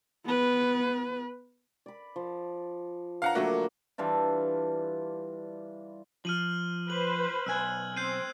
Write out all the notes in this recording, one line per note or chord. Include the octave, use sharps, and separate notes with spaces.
B3 B4
D5 B5
F3
D4 B4 C#5 F5 F#5 A#5
D3 F#3 A3 A#3 F#4
E3 G3 D4 F4
F3 F6 D#7 F#7
B4 C5 F#7
B1 G#5 E6 F#6 G#6
C4 G6 C7 D#7